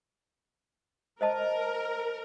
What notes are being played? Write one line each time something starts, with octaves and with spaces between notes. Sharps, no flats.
A#4 C5 D#5 A5